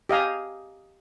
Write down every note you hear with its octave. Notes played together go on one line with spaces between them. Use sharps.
G4 D#5 F5 G#5